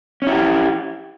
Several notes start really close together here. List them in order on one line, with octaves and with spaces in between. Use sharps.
C#4 E4 G4